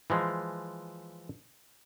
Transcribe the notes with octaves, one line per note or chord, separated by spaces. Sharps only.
E3 F3 G#3